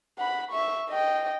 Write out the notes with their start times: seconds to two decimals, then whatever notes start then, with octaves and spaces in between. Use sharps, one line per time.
0.18 F#5 B5
0.51 E5 C#6
0.89 D#5 G5